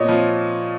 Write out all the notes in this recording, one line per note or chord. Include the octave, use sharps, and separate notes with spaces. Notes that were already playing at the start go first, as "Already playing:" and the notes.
Already playing: A#2 C#5 D#5
F3